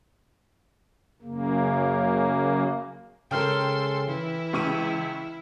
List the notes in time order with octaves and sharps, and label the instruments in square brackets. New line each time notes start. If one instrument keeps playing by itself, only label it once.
[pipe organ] F#2 C#3 A#3
[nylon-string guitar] C#3 G#3 A#4 [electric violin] A4 C6 [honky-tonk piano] G5 F6
[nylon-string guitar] E3 [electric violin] E4
[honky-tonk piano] C#2 C#6 D#7